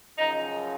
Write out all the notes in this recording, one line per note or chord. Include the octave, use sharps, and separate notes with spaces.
F#2 C#3 F3 D#4